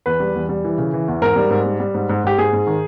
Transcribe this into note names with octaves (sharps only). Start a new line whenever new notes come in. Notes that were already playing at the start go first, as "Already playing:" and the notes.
E2 B4
G3
E2
G3
E3
C#3
E3
E2
G#2 A#4
G3
G#2
G3
G3
G#2
G#2
G#2 G4
G#2 G#4
G#2
D#3